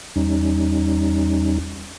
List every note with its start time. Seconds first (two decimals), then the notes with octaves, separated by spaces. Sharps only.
0.16 E2 G3 C#4 D#4